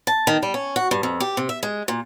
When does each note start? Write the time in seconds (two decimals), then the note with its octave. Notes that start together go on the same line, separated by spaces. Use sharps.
0.07 A5
0.27 D#3
0.42 G3
0.54 C#4
0.76 F#4
0.91 G2
1.03 F2
1.20 G4
1.37 C3
1.49 E5
1.63 G#3
1.88 A#2